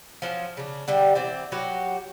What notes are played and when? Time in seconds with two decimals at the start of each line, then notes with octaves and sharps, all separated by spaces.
0.22 F3 F#3 A3 C#4
0.57 C#3 D4
0.88 D3 G3 G5
1.15 E3 C4 D5
1.52 F#3 F#4 G4 B4